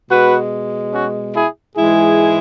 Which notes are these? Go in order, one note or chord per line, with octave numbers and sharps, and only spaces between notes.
B2 G#3 F#4 B4
C#4 F#4
E4 G#4
G#2 E3 G#3 E4 G#4